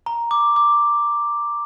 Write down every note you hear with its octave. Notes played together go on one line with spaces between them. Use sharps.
A#5
D6
D6